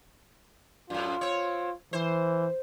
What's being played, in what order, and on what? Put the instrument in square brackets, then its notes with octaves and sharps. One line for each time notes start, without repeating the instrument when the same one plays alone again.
[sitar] F#2 A2 [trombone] F4
[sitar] C4 C#5
[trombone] E3 [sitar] C5